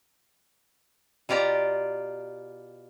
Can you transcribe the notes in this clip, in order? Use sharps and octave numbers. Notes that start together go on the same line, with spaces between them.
B2 F4 G4 D5 A#5